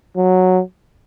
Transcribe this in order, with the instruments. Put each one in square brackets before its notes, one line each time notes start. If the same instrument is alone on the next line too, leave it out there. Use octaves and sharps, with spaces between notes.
[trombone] F#3